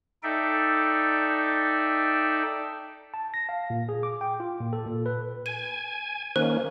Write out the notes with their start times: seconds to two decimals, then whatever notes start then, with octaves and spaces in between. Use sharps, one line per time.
0.23 D#4 A4 D5 E5 G5
3.14 A5
3.34 A#6
3.49 F5
3.70 A#2
3.89 G#4
4.03 D6
4.21 G5
4.40 F4
4.60 A#2
4.73 A4
4.87 A#2
5.06 B4
5.46 G#5 D#7
6.36 D#3 A#3 C#4 C5